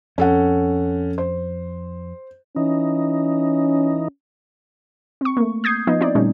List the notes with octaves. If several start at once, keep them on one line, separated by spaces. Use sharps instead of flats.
F2 C#4 A4 F#5
C5
E3 C#4 D#4
C4 C#6
A3 A#3
D#6 G6 G#6 C7
F3 B3 D#4 F4 D#5
C4 D#4 E4 D5
A#2 D3 G3 A3 C#4 D#4